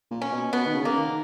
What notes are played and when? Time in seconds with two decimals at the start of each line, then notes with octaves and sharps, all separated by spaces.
0.11 A#2
0.22 C#4
0.32 B2
0.53 B2 B3
0.66 D#3
0.75 C#3
0.85 A#3
0.96 D#3